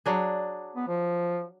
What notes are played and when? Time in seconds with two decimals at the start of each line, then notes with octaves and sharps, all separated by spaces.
0.06 F#3 D4 G#4
0.76 B3
0.88 F3